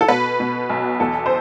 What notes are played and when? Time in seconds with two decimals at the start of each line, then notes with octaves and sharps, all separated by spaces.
0.01 A4
0.08 B2 B4
0.40 B2
0.69 B1
1.00 E2 A4
1.26 C5